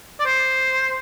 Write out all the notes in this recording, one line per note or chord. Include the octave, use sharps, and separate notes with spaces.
D5
C5